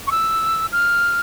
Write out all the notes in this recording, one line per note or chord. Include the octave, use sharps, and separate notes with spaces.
C#6
E6
F6